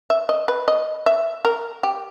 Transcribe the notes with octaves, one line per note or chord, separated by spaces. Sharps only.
E5
D#5
B4
D#5
E5
A#4
G4